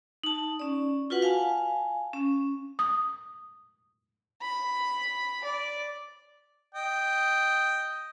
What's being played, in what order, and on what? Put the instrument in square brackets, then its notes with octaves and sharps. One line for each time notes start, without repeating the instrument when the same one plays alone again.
[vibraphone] D#4 A5
C#4 D5
F4 F#4 B4 F#5
F5 G#5 A5
C#4
[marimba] D#6
[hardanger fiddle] B5
D5
[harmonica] D#5 G5